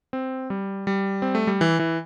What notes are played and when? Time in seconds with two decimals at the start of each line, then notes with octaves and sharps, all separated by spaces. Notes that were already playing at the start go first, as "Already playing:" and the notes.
0.13 C4
0.50 G3
0.87 G3
1.22 C4
1.35 A3
1.47 G3
1.61 E3
1.79 E3